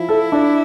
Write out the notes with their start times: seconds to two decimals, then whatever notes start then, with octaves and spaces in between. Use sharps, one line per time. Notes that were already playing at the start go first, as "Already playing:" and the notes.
Already playing: F3 E4
0.09 A4
0.32 D4